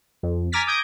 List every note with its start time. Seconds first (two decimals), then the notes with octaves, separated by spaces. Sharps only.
0.23 F2
0.52 G#5 A#5 D6 F6 A6 B6
0.67 D6 D#6 G6 G#6 A#6 D7